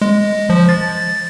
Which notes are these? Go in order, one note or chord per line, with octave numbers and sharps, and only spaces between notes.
G#3
F3
A6